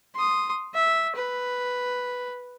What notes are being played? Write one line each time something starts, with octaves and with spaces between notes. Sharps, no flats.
C6 D#6
E5
B4